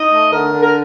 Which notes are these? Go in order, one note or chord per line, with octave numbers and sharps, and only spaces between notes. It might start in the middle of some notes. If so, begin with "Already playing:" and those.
Already playing: D#4 D#5
A3
D3 A#4
D3
A#4